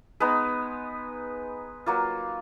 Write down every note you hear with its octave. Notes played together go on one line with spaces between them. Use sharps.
G#3 B3 D#4 B4
F#3 A#3 F4